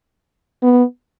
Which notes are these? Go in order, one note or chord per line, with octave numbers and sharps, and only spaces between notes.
B3